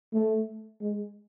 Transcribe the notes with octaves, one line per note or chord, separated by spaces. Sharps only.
A3
G#3